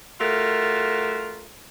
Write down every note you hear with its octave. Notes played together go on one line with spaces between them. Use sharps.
A3 F4 F#4 A#4